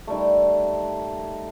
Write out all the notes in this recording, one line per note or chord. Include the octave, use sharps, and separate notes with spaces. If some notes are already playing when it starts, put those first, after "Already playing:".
D#3 G3 A3